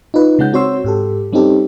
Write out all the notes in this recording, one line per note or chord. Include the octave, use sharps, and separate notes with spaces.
D#4 F4 B4
C#3 G#3 C#4 F#5 G6
C4 F#4 C#5 C6 E6
G#2 G4 A4
G3 C4 C#4 D#4 G4 A4